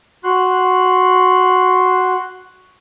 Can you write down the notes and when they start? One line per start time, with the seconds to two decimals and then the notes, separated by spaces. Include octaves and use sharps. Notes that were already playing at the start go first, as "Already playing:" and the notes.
0.24 F#4 C6 F#6